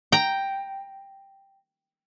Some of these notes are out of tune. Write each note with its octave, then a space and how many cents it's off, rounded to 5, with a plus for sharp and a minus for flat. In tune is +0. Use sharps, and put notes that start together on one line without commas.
G5 +0 A#5 +0